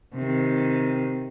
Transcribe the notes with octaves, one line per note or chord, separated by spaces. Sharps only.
C3 D#3